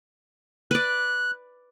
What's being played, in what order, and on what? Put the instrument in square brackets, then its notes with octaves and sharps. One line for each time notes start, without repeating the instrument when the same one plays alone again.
[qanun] B4 D5 [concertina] F#6